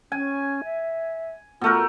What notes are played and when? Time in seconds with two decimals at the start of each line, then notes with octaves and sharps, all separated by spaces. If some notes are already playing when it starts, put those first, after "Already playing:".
0.12 C#4 G#5
0.64 E5
1.61 B2 A3 F4 A#4